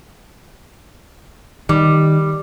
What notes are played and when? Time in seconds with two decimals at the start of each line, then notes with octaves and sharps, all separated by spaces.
1.69 D#3 G3